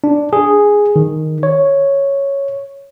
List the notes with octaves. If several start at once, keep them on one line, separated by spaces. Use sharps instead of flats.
D4
G#4
D#3
C#5